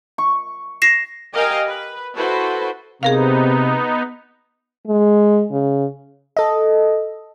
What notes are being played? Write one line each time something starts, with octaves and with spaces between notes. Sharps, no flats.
C#6
A#6 C7 E7
G4 A#4 D#5 F5 G5 G#5
B4
E4 F#4 A4 B4 C5
C3 B3 D#4 G#4 A#4 F5
G#3
C#3
A4 D#5